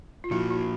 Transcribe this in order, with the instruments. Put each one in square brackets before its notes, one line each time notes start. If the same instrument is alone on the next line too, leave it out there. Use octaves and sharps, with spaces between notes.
[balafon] F4
[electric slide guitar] A#2 F3 A#3 [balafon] E4 F#4
[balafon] E4 F#4